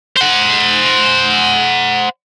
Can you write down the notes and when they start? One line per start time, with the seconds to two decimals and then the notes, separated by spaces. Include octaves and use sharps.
0.16 C5 F#5